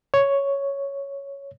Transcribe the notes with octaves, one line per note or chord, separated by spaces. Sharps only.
C#5